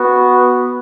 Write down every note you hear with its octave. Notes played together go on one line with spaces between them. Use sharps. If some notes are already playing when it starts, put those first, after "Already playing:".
Already playing: B3 F#4